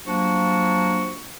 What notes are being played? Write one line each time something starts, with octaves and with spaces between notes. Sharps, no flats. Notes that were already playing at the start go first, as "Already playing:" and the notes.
F3 F#3 A#3 D4 F#4